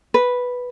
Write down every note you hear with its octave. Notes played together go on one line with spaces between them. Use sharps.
B4